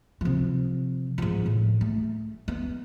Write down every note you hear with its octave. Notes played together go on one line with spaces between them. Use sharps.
C3 F3
G#2 F3
A2
A3
B3